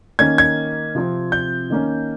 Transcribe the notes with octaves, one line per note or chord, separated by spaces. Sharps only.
D#3 A#3 C#4 G#6
G#6
C3 F3 C4
G6
D#3 A#3 C#4